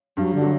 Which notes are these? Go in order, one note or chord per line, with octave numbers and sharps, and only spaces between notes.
G2 F#3
D3
F#3